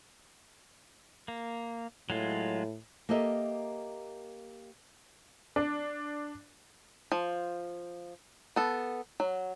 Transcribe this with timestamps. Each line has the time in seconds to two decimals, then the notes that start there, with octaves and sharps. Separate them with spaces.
1.28 A#3
2.10 A2 F#3 G#3 F4
3.09 A#3 G4 A4 A#4 D#5 E5
5.56 D4
7.12 F3
8.56 B3 A4
9.20 F#3